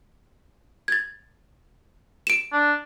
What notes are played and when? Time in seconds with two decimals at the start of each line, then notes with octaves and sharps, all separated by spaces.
0.88 G#6 A6
2.27 D7 E7
2.52 D4